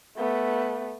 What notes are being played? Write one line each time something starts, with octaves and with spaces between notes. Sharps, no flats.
A3 B3